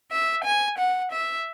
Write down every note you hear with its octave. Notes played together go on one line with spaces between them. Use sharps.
E5
G#5
F#5
E5